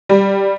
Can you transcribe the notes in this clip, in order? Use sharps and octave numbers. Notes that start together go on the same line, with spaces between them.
G3